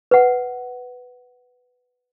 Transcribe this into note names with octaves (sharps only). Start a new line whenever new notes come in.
B4 F#5